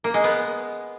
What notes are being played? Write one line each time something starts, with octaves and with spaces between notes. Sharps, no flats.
A#3
G#3
B3